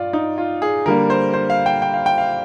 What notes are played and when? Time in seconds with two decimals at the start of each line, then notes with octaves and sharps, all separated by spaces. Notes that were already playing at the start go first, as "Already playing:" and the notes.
Already playing: G2 F4 D5
0.13 D#4
0.38 F4
0.62 G#4
0.86 D3 G3 A#3 A#4
1.10 C5
1.34 C5
1.50 F5
1.66 G5
1.82 G5
1.94 F5
2.06 G5
2.18 F5